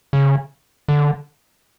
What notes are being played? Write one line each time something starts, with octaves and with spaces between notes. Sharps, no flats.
C#3
D3